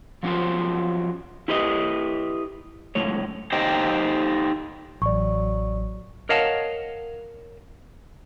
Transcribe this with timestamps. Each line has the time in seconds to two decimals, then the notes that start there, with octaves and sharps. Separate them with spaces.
0.23 F3 F#3 C#4 F4 G4 C5
1.48 E4 G4 B4 D#5
2.95 C#2 F#2 A2 C#5
3.53 D#4 G4 A4 C5 D#5 G5
5.02 A1 F#3 D5 C#6
6.29 A#4 C#5 D#5 F5 F#5 A5